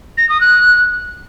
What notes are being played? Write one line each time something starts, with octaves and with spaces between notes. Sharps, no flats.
A#6
D#6
F#6